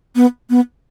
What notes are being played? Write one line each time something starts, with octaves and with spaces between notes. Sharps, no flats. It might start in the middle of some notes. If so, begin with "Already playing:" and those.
B3
B3